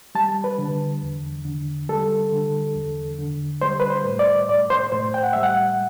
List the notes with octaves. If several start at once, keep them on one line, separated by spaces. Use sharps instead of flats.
G3 A5
B4
D3
E2
D3
G3 A4
D3
E2
D3
G3 C5
B4
C5
A2
D5
A2 D5
C5
A2 C5
G5
F#5
G3 E5
F#5